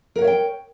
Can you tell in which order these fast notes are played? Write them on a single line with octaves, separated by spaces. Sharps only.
A#4 F#5 C#5 E5 G5